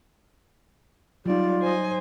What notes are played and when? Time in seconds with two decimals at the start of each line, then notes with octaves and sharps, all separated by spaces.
1.26 F#3 G3 D#4 F4 D5
1.62 C5 D#5 G#5